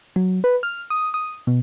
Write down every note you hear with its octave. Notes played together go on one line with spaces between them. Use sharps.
F#3
B4
F6
D#6
D#6
B2